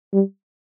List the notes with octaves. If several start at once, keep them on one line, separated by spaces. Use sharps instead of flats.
G3